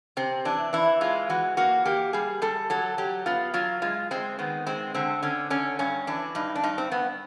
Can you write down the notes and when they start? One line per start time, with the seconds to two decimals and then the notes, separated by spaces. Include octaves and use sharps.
0.17 C3 C4
0.45 E3 D4
0.73 E3 E4
1.01 G#3 F4
1.30 E3 F#4
1.57 A#3 F#4
1.85 A#3 G4
2.13 G3 G#4
2.42 G3 A4
2.70 F#3 A4
2.98 F#3 G4
3.26 B3 F4
3.54 F#3 F4
3.82 G#3 F4
4.11 G#3 C4
4.39 D#3 B3
4.67 G#3 C4
4.94 D3 C4
5.23 D3 C#4
5.50 D3 C#4
5.79 G2 C#4
6.07 E3 D4
6.35 G2 D#4
6.55 D4
6.63 G2 D#4
6.78 C4
6.91 G2 B3